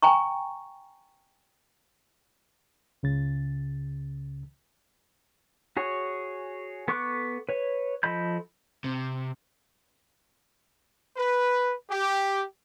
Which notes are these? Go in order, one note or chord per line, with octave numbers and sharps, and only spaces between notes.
G5 G#5 A#5 C#6
C#2 C#3 A6
F#4 G#4 C#5
B3 A4 C#6 D6 F#6
B4 C#5
F3 A4 D#5 B5 G6
C3
B4
G4